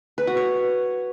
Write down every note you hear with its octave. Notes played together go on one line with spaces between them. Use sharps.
B4
F#4
C#5